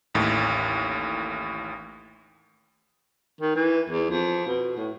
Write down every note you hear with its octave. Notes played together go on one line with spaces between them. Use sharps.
A1 D#2 A2
D#3
E3
E2
F2
B2
A2